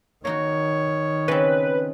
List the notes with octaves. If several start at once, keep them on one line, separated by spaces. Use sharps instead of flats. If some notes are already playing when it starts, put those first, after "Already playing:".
D#3 A#3 D#4 F#4 C#5
C#3 C4 B4